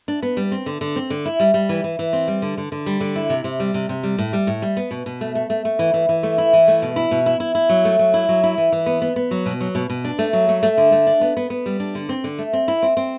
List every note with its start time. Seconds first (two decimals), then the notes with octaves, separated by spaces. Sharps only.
0.08 D4
0.23 B3
0.37 G3
0.52 C4
0.66 D3
0.81 D3
0.96 C4
1.10 D3
1.26 E4
1.40 G3
1.54 G3
1.69 E3
1.84 E3
1.99 E3
2.13 C4
2.28 G3
2.42 D3
2.58 D3
2.72 D3
2.86 G3
3.01 D3
3.16 E4
3.30 C3
3.44 C3
3.60 G3
3.74 C3
3.89 C3
4.03 G3
4.18 A2
4.33 G3
4.47 A2
4.62 G3
4.77 B3
4.91 B2
5.06 B2
5.21 A3
5.35 A3
5.50 A3
5.65 A3
5.79 E3
5.94 E3
6.09 E3
6.23 A3
6.38 E4
6.53 E3
6.68 A3
6.82 B2
6.96 E4
7.11 B2
7.26 E4
7.40 E4
7.55 E4
7.69 F#3
7.85 A3
7.99 F#3
8.14 E4
8.29 F#3
8.43 E4
8.58 E3
8.72 E3
8.86 B3
9.02 B3
9.16 B3
9.31 F#3
9.46 B2
9.61 F#3
9.75 B2
9.90 B2
10.05 D4
10.19 A3
10.33 F#3
10.49 A3
10.63 A3
10.78 D3
10.92 A3
11.07 D4
11.21 B3
11.37 B3
11.50 B3
11.66 G3
11.80 D4
11.95 D3
12.09 C4
12.24 D3
12.39 A3
12.53 C4
12.68 E4
12.82 C4
12.97 C4